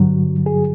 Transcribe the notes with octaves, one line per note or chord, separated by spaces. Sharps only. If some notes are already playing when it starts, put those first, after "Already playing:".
Already playing: G2 D3 F#3 F#4
G#4